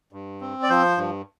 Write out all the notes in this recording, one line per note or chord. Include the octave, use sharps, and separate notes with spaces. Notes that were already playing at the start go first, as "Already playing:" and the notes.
G2
C4
D5
F3 C5
G2